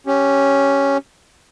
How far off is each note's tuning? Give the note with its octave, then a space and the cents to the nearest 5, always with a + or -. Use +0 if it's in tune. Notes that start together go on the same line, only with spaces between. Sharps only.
C#4 +0 G4 +0